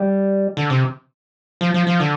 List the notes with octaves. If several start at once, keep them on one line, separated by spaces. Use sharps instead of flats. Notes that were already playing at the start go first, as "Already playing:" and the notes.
Already playing: G3
D3
C3
F3
F3
F3
D3